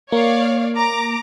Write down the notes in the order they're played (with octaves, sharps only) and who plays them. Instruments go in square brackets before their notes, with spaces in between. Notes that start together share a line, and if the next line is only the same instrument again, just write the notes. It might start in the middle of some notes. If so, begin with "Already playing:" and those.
[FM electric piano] A#3 [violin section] C#5 D5 F5
[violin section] A#5 D6